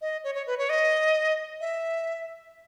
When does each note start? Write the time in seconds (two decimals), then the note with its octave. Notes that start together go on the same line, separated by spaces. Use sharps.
0.01 D#5
0.24 C#5
0.35 C#5
0.47 B4
0.58 C#5
0.70 D#5
1.61 E5